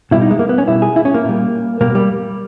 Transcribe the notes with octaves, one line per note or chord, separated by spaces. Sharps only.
B2 G3 E4
D#4
G#3
A#3
B3
C#4
B2 G3 E4
G#4
E4
C#4
A#3
A#2 G3
B2 G3 A#3
G3